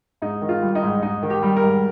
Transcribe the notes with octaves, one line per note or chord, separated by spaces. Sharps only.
G#2 D#4
D#3
F4
G3
D#4
G#2
G#2 D#4
D#3
G4
G3
A#4
G#2